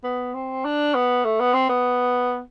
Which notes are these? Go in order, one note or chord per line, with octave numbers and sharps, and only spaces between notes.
B3
C4
D4
B3
A3
B3
C4
B3